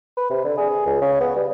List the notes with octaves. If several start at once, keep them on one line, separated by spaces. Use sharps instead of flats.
B4
C3
D3
G#4
C#2
C#3
B3
G3